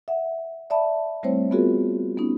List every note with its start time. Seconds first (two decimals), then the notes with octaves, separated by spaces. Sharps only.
0.08 E5 F#5
0.70 D5 E5 A5 B5
1.23 G3 A3 C4 E4 C5 C#5
1.51 B3 C4 F4 F#4 G#4 A#4
2.17 B3 C#4 D#4